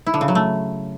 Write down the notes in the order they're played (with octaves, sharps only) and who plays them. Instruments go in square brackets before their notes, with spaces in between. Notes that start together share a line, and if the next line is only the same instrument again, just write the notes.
[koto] E4
D3
C#3
F#3
A3